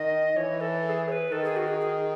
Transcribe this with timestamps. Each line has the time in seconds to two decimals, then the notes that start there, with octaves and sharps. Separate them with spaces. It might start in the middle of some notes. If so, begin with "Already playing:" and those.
Already playing: D#3 D#5
0.36 E3 C#5
0.60 A4
0.84 A4
0.89 G#4
1.08 C#5
1.12 B4
1.32 D#3 A4
1.44 G#4
1.56 F#4
1.68 G#4
1.80 G#4